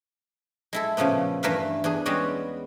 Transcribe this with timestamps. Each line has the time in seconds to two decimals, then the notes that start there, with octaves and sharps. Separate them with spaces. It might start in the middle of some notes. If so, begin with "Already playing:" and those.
0.73 G#3 E4 A4
0.97 A#2 C#3 F3 A3 B3
1.43 G2 E3 A3 A#4 B4 F5
1.84 E2 D4 G#4
2.06 G3 G#3 B3 C#4 F#4 D5